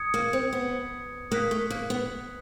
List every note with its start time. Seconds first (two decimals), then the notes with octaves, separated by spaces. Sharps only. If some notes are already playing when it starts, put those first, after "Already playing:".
Already playing: D#6 G#6 C#7
0.14 A#3
0.33 C4
0.53 B3
1.31 A#3 D#6 F#6 B6
1.51 A3
1.70 A#3
1.90 B3